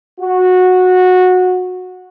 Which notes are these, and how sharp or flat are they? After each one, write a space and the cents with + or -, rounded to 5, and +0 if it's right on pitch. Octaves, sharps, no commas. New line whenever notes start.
F#4 -15